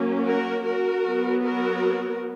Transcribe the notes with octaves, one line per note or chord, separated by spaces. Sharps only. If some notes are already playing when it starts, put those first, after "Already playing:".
Already playing: F#3 A#3 C#4
F#4 A#4
F#4 A#4
F#3 B3
F#4 A#4